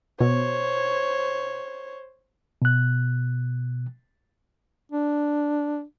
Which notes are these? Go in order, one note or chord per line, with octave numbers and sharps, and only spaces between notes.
B2 C5 C#5
B2 F#6
D4